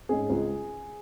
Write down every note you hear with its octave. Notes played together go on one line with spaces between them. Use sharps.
G#2 G#3 C#4 G#4
C#2